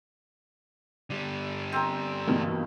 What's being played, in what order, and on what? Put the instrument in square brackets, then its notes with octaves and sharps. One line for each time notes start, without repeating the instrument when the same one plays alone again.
[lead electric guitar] D3 G3
[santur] C4 A#4
[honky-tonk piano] G2 B2 D#4 [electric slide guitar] E3 A#3